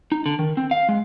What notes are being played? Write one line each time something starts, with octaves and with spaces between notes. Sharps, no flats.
D#4
D3
D#3
C4
F5
G#3